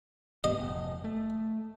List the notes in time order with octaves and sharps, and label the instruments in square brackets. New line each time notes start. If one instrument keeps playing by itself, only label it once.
[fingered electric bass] D2 G#2 B3 [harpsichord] D#5
[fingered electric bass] F1
A3